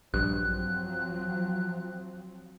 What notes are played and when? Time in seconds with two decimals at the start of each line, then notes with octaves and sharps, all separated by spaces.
0.14 A#1 G2 F3 F#3 C4 F#6